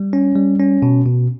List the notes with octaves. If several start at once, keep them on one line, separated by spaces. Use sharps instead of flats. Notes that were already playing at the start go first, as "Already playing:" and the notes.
Already playing: G3
C#4
G3
C#4
B2
B2